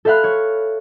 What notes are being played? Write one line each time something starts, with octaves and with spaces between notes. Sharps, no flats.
A4 C5 E5 F5 B5 F#6
C#5